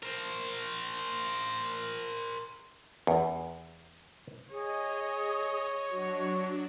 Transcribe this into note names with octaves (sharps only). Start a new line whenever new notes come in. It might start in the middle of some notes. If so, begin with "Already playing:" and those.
A#4 C5
E2
G#4 C#5 D#5
F#3 D4 F#4